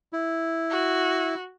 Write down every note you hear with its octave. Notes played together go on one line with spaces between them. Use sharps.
E4
F#4